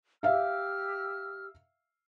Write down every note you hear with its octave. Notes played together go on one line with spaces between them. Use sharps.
G4 E5 F5 E6 F6